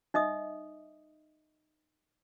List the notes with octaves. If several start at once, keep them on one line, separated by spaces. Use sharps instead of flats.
D#4 D#5 E5 D#6